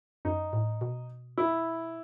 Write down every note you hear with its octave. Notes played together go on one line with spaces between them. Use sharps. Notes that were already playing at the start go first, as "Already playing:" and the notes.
F#2 D#4
A2
B2
E4